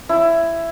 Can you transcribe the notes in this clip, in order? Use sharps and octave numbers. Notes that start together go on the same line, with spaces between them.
E4